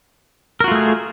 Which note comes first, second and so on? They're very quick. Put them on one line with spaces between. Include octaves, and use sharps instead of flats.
A#4 F#4 F4 A3 G#4